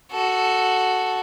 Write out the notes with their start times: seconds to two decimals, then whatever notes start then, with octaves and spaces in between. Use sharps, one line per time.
0.11 F#4 A4